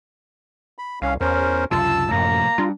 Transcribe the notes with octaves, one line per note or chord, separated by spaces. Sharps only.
B5
C2 C#4 F5
E2 C#4 A#4 C5
C#2 F#2 C3 F4 A5 E6
F#2 A2 C3 F3 A#3 A#5
G3 D4 F4